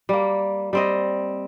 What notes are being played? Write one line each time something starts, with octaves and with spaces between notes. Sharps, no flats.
G3 A#3
G3 C4 D#5